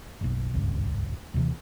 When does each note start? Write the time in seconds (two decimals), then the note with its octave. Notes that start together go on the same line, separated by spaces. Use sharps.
0.21 F#1 B1
0.54 D#1 G#1 C#2 G2
1.34 D#2 C3 E3